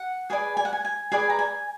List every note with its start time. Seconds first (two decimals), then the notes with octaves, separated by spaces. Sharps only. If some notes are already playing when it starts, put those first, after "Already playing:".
Already playing: F#5
0.30 G#4 B4 D5 G#5
0.57 G#5
0.65 F#5
0.73 G#5
0.85 G#5
1.12 G#4 B4 D5 G#5
1.30 A#5
1.39 G#5